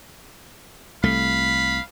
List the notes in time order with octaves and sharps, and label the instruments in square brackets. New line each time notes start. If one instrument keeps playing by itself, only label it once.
[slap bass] C2 A3 [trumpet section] F5 B5